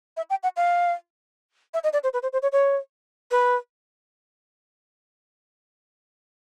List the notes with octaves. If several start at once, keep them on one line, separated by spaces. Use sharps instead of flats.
E5
G5
F#5
F5
E5
D#5
D5
C5
B4
C5
C5
C#5
C#5
B4